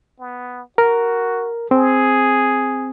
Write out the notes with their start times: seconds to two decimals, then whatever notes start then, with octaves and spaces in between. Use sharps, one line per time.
0.20 B3
0.78 F#4 A#4
1.71 C4 G#4